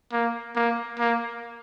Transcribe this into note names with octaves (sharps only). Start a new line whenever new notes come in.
A#3
A#3
A#3